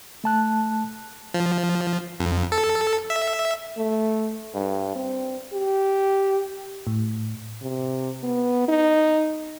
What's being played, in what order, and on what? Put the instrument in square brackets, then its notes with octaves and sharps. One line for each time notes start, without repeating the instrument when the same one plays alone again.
[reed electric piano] A3 A5 F#6
[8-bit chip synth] F3
F2
A4
E5
[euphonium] A3
G2
C4
G4
[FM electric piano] A2
[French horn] C3
B3
D#4